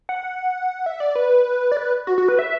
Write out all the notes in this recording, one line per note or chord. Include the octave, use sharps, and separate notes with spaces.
F#5
E5
D5
B4
D5
B4
F#4
F#4
B4
E5